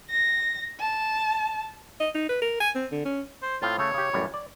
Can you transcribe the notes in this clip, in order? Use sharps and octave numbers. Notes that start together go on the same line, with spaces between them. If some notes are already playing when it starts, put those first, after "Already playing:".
A#6
A5
D#5
D#4
B4
A#4
G#5
C4
D3
C#4
C5
A2 C4 F4 F5
C#3 A3 C#5
C#3 G4
A1 F#2 G3
D5